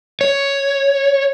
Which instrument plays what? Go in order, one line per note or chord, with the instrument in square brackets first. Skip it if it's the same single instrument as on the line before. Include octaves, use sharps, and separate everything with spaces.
[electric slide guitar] C#5